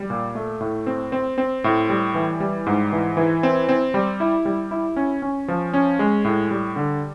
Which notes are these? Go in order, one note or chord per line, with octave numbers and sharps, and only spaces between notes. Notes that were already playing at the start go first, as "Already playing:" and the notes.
Already playing: G3
A#2
A3
A2
C4
C4
C4
A2
G3
E3
G3
G#2
E3
E3
C4
C4
G3
E4
G3
E4
C#4
C#4
F3
C#4
G#3
A2
G3
D3